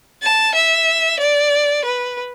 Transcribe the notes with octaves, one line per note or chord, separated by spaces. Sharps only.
A5
E5
D5
B4